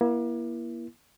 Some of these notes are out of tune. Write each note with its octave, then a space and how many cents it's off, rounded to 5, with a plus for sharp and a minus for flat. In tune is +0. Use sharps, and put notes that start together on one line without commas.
A#3 +40 E4 +20